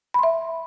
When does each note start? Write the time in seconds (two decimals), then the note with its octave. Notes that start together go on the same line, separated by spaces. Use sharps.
0.14 B5
0.19 C6
0.23 E5